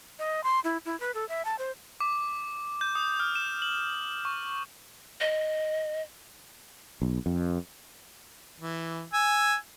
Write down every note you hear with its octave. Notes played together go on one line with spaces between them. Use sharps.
D#5
C6
E4
E4
B4
A4
E5
A5
C5
D6
G6
D#6
F6
E7
F#7
C#6
D#5
B1
F2
E3
G#5 E6